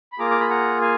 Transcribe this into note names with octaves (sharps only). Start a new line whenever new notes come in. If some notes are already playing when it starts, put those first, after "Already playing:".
B5
A#3 F4 G#4 A#5 D6
D6
B5
F#5 A#5
F5 G#5